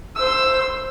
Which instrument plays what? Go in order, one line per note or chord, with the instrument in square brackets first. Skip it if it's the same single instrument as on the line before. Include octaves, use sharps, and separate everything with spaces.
[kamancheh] C5 E6